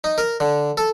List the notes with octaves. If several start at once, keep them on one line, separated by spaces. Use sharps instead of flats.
D#4
A#4
D3
A4